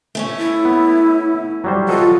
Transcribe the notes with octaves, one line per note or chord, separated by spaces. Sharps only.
A3 C#4 C#5
E4
B3
F#3 G3 C5
F4 F#4 A4 D#5